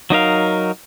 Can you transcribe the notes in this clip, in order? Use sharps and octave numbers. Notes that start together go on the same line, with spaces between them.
F#3 D#4 A#4 F5